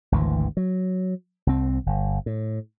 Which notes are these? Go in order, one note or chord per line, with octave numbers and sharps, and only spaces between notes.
G#1 D2 E3
F#3
C2 C4
G1
A2